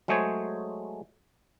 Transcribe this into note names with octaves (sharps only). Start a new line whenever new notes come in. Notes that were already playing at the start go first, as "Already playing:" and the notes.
F#3 G#3 A3 G#4 C5 C#5